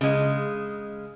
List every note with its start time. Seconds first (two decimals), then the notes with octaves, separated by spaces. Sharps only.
0.01 C#3 G#3